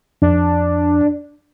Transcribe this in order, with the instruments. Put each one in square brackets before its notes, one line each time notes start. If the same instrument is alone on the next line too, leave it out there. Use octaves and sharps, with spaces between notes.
[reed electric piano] F2 [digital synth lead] D4